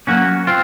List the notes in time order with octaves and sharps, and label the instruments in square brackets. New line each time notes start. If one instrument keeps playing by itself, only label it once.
[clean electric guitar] F#3 A#3 C#4 F#4
C4 F4